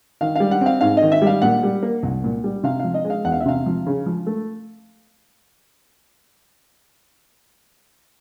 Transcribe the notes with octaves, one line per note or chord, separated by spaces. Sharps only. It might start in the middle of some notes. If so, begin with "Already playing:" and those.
D#3 F5
G3 F5
F#5
C4 F5
G#2 F5
D#3 D#5
E5
G3
F5
A#2 F#5
G3
A#3
C2
A#2
G3
C3 F5
F3 F5
D#5
G#3
F5
E2 F#5
F5
E5
C3 F5
F3
C#3
F3
A3